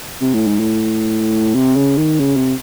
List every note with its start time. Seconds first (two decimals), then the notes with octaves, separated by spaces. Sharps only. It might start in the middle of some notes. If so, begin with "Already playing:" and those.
0.21 C3
0.34 A2
0.47 G#2
0.60 A2
1.55 C3
1.76 C#3
1.98 D#3
2.20 C#3
2.36 C3